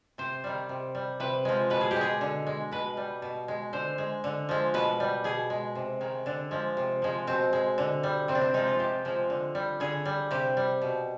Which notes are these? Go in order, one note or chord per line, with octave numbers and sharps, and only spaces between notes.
C3 C5
D#3 G3
C3
G3
C3 B4
F3 G#3
B2 B4
G#4
G4
G#3
G#4
D3
G#3
B2 B4
G3
B2
G#3
D3 C5
G#3
D3
F3 G#3
B2 B4
G3
B2 G#4
G#3
C3
D#3 G#3
D3 D4
F3 G#3
C3
F3 G#3
B2 C4
G#3
D3
G3
C3 C4
D4
C4
F3 G#3 D#4
F4
C3 G4
F3 G#3
D3
G3
D3 G#4
G3
C3 G4
G3
B2